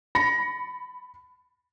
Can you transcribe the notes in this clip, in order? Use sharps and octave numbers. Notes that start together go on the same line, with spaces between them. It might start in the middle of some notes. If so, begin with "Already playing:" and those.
B5 A6 A#6 C#7